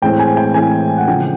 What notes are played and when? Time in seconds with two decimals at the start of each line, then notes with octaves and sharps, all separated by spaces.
0.02 A2 E3 G#3 C4 G5
0.19 G#5
0.37 G5
0.54 A2 E3 G#3 C4 G#5
0.98 F#5
1.07 C#3 F3 A3 C4 G5